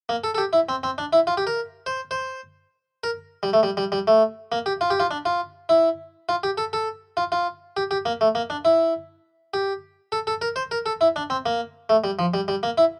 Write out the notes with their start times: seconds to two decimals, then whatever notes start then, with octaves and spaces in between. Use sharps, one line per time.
0.09 A#3
0.24 A4
0.35 A4
0.38 G4
0.53 E4
0.69 C4
0.83 C4
0.98 D4
1.13 E4
1.27 F4
1.37 G4
1.47 A#4
1.86 C5
2.11 C5
3.04 A#4
3.43 G3
3.53 A3
3.63 G3
3.77 G3
3.92 G3
4.07 A3
4.52 A#3
4.66 G4
4.81 F4
4.90 G4
5.00 F4
5.11 D4
5.25 F4
5.69 E4
6.29 F4
6.43 G4
6.58 A4
6.73 A4
7.17 F4
7.32 F4
7.77 G4
7.91 G4
8.06 A#3
8.21 A3
8.35 A#3
8.50 D4
8.65 E4
9.54 G4
10.12 A4
10.27 A4
10.42 A#4
10.56 C5
10.71 A#4
10.86 A4
11.01 E4
11.16 D4
11.30 C4
11.46 A#3
11.89 A3
12.04 G3
12.19 F3
12.34 G3
12.48 G3
12.63 A#3
12.78 E4